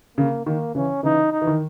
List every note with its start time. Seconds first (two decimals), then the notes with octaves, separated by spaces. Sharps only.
0.18 C#3 A#3
0.46 D#3 A#3
0.75 C#3 E3 C#4
1.03 C#3 E3 D#4
1.32 D#4
1.41 E3
1.47 D#3